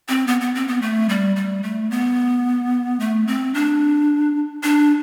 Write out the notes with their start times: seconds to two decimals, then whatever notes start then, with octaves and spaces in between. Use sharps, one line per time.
0.09 C4
0.27 B3
0.41 B3
0.55 C4
0.68 B3
0.82 A3
1.09 G3
1.36 G3
1.63 A3
1.91 B3
3.00 A3
3.27 C4
3.54 D4
4.63 D4